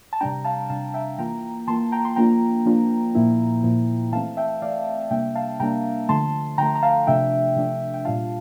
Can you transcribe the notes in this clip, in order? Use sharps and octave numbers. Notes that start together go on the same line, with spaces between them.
A5
C3 G3 D4 G5 A#5
F5 A5
C3 G3 D4 F5 A5
E5 G5
E3 A#3 F4 G5 A#5
E3 A#3 F4 A5 C6
G5 A#5
C6
F3 A#3 D4 F4 G5 A#5
F3 A#3 D4 F4
A#2 F3 A#3 E4
A#2 F3 A#3 E4
E3 A3 C4 F5 A5
E5 G5
E3 A3 C4 D5 F5
C3 G3 A#3 D4 E5 G5
F5 A5
C3 G3 A#3 D4 G5 A#5
D3 F3 A3 A5 C6
D3 F3 A3 G5 A#5
A#5
F5 A5
C3 F3 A3 D4 E5 G5
C3 F3 A3 D4
G5
A#2 G3 D4 F4 F5 A5